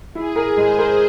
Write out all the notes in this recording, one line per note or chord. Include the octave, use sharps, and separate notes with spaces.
E4 G#4
A#4
G#3 C5
A#4